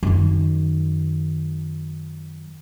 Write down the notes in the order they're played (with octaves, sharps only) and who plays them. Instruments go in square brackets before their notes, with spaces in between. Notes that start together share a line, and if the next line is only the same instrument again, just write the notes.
[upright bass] F#2 D#3